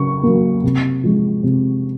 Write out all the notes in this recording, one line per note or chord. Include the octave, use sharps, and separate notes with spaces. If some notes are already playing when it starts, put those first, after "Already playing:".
Already playing: C#3 F#3 C#6
F#3 A#3
C3
F3 G#3
C3